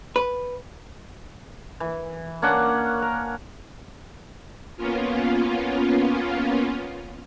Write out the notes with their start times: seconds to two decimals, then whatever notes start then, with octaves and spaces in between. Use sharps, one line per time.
0.16 B4
1.80 E3
2.42 A#3 C#4 D4 F#5
3.02 A#4
4.77 A#3 B3 C#4 F4